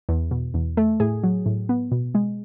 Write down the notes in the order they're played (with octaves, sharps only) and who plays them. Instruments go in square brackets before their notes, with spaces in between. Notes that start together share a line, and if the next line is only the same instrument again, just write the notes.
[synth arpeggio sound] E2
B2
E2
A3
A2 G#4
F#3
A2
B3
B2
G#3